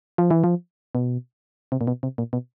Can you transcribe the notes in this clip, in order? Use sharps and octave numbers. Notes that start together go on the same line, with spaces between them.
F3
E3
F3
B2
C3
A#2
B2
C3
A#2
B2